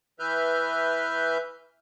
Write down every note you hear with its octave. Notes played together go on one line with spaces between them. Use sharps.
E3 B4 E5 F6 G6